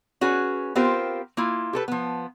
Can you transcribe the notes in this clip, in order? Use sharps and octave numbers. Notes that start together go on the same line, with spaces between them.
C#4 F#4 G#4 B4
B3 C4 F4 G4 A#4 C5
A#3 E4 F4
G4 A4 B4
F3 B3